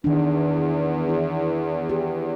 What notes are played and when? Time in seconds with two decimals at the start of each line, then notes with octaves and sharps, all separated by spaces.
0.04 E2 D#3 D4
1.09 E4
1.89 G4